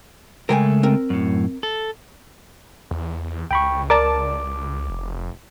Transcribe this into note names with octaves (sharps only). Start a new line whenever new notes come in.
C#3 G#3 A3 A#4 G5 G#5
C4 A#4
F#2 A2
A4
E2
C#2 G5 B5 C#6
A#4 D5 A5 D6
F1